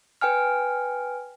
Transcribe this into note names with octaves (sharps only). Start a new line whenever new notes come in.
B4 G5 G#5 F6